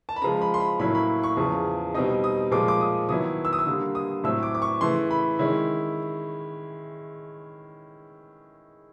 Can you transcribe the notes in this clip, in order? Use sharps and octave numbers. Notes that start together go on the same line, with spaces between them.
A5
B5
C#3 F3 G#3 A#5
B5
C6
B5
A2 F#3 A#3 C#4 E4 B5
B5
C#6
E2 C#3 F3
B2 G3 C4 D#4 D#6
D#6
A#2 F3 G#3 D6
D6
D#6
D#3 F#3 B3 E4 D#6
E6
D#6
E6
D3 G3 A#3
D#6
A2 F#3 A3 C4 E6
D6
D6
C#6
C#3 E3 A3 C6
B5
D#3 G#3 C#4 E4